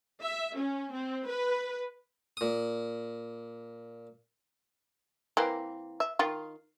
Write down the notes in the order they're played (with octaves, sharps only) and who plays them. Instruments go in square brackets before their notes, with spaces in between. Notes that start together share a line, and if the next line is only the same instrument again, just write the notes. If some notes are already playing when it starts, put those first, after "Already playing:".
[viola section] E5
C#4
C4
B4
[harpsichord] A#2 D#6
[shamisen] E3 A#3 C4
E5
D#3 F4